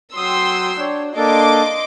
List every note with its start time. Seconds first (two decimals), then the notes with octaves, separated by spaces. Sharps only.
0.16 F#3 G5 C6 D#6 E6
0.79 D4 C#5
1.16 A#3 D4 A4 D#5 C6 D6